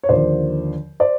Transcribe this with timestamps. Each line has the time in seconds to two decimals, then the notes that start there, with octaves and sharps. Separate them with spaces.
0.03 C#5
0.09 D#2 D3 F3 C5 D5
1.00 C5 D5